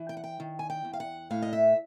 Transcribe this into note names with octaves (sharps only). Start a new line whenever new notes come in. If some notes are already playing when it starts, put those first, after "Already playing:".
Already playing: E3
G5
F#5
G5
D#3
G#5
G5
E2
F5
F#5
A2 F5
D#5
E5